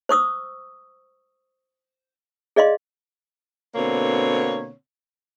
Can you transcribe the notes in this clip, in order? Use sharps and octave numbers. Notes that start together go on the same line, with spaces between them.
C5 C#6 D#6 E6
G#4 D5 D#5 F5 C6
B2 D3 A#3 C4 C#5